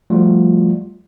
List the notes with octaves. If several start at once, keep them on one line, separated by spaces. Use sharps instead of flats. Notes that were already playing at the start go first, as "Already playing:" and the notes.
F3 G3 A3 F4 F#4 D5